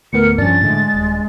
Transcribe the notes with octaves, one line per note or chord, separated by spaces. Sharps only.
D2 A2 B3 A#4 C#7
G2 F3 C#4 D4 A6
A2 D3 G#3
D#1